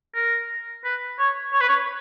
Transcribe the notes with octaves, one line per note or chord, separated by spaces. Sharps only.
A#4
B4
C#5
C#5
B4
C#5